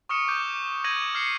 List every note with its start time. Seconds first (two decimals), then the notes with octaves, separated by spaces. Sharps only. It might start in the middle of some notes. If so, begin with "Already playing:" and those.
0.09 C#6 D#6 F6 C#7 E7
0.28 D6 G6
0.84 G6 G#6 A#6 D#7 F#7
1.15 F6 C7 C#7